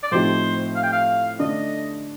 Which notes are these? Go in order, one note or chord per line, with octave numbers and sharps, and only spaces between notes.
D5
A2 F3 C4 D#4 G4 C5
F5
G5
F5
D3 A3 D4 D#5